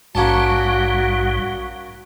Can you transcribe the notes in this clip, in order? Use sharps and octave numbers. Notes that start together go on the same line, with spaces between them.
A#1 G#2 G3 A#3 C#4 F#4 A5